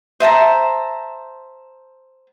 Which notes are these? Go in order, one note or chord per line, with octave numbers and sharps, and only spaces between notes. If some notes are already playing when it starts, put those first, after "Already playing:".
C5 E5 A5 A#5